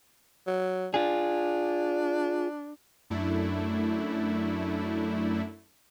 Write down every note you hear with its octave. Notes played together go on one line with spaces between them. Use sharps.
F#3
D4 F4 G#4
F#2 A3 D4 E4